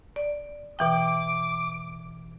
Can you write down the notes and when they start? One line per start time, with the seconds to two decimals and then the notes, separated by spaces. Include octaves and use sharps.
0.16 D5
0.79 B2 E3 G5 D6